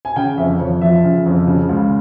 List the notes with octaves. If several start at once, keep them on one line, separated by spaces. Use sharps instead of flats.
G#5
C#3 G5
F2 E5
F2 C#5
F3 E5
C#3
F2
C#3
C#2